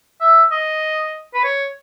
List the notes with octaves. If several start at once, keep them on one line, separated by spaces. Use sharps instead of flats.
E5
D#5
B4
C#5